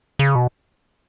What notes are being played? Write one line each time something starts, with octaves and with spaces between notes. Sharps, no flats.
C#3
B2